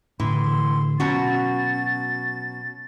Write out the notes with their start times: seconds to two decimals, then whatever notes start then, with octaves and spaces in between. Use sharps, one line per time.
0.20 A2 D3 E3 C6
1.00 B2 F#3 C#4 F#4 A6